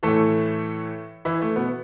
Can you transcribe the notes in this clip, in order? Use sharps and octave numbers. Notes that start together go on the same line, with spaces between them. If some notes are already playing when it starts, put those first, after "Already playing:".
A2 E3 A3 A4
E3 E4
A3
B2 B3